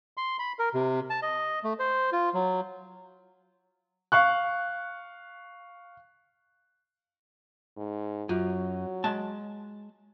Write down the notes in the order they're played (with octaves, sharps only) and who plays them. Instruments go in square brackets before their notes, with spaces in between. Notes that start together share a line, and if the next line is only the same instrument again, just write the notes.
[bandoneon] C6
B5
A#4
C3
A5
D#5
A3
C5
F4
F#3
[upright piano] F5 C#6 F#6
[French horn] G#2
[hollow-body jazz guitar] F#2 [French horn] F#3 [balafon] F4
[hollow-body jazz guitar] G#3 A5